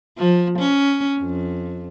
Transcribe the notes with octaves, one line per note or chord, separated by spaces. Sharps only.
F3
C#4
F2